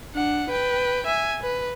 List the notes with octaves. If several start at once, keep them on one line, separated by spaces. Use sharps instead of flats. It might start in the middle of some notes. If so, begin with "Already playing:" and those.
D4 F#5
B4 G5
E5 G#5
B4